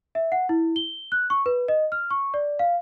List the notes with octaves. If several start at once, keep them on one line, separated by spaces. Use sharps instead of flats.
E5
F#5
E4
G7
F#6
C#6
B4
D#5
F6
C#6
D5
F5